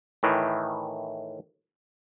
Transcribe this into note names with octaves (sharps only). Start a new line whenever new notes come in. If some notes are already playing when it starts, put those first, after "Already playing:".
A2 D#3 E3